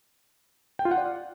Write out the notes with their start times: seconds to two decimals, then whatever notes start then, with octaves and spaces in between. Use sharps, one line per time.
0.79 G5
0.85 F4
0.91 F#5
0.97 D5